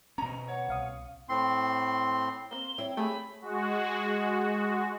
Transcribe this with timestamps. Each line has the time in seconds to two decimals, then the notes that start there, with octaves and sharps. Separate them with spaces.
0.18 B2 C#4 A#5
0.48 C#5 F#5
0.68 C2 F5 D#6
1.29 A2 C4 C6
2.51 A#3 C4 G7
2.78 C4 E4 C#5
2.97 A3 G4 G#4 B5
3.41 G#3 F#4